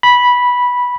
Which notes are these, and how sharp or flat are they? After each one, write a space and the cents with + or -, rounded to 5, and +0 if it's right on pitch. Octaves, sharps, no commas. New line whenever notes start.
B5 -10